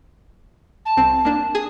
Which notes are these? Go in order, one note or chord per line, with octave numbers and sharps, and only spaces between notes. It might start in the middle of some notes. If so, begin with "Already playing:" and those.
A5
C2 C4
A#3 D4
G#4 D#6